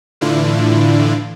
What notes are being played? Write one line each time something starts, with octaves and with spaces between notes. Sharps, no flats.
A2 D3 E3 D4 E4 F4